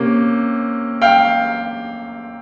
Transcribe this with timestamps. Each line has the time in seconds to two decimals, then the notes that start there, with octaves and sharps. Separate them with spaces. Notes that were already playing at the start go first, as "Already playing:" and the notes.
Already playing: C3 A#3 C#4
1.02 F5 G5